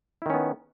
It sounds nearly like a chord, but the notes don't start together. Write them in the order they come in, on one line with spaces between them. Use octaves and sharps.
E4 D#3 C#4 B3